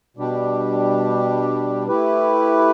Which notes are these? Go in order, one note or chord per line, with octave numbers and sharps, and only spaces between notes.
B2 G3 D4 G4
A3 E4 G4 B4